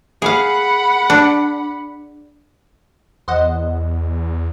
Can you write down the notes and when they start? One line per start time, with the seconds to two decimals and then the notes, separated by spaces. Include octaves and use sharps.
0.22 G#4 F5 F#5 B5
1.10 D4
3.28 E2 C5 D#5 F#5